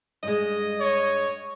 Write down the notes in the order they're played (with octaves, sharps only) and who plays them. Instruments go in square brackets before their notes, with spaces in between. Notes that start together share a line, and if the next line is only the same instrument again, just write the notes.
[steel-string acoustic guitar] G2 G#3 [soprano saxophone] D#5
[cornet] C#5